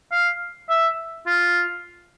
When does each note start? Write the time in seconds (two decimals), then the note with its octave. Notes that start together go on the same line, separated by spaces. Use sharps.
0.12 F5
0.69 E5
1.26 F4